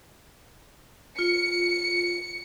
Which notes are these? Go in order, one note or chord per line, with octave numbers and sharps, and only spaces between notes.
F4 C#7